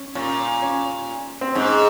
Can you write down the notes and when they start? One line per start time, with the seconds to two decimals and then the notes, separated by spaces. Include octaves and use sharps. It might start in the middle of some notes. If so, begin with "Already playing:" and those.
Already playing: C#4
0.15 A#2 C#4
0.62 C#4
1.41 C4
1.55 G#2 C#4